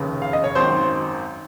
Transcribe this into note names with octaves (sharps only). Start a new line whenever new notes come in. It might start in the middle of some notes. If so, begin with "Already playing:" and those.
Already playing: F1 D#2 C#3
F5
D#5
C#5
G#1 F#2 D#3 C5